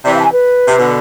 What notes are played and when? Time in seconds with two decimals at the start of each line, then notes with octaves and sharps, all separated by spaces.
0.05 C3 E3 D5
0.14 F5
0.20 A5
0.24 G#5
0.32 B4
0.68 C3
0.79 B2 D3